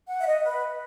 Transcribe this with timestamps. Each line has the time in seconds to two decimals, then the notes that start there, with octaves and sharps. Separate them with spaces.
0.09 F#5
0.19 E5
0.26 D#5
0.44 B4